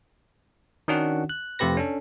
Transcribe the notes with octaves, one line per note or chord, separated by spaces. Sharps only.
D#3 C#4 D4 F#4 F#5
F#6
F2 C3 A3 G4 B4 A#6
C#4 D4 A4